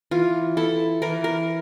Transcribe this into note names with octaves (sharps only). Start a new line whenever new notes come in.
E3 F4
E4 A4
E3 A#4
A#4